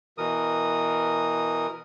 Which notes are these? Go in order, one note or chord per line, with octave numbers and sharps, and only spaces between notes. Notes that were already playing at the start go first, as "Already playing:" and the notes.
B2 E3 A#4 D#6